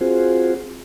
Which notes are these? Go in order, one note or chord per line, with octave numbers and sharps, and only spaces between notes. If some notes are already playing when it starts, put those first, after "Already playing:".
C4 F4 F#4 G#4 C5